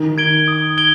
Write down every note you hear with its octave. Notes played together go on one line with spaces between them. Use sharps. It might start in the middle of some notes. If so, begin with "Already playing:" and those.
Already playing: D#3
G#6 D7 G7
D#6
G#6 D7 G7